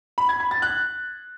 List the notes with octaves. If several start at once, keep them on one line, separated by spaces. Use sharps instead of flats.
B5
G#6
B5
A6
F#6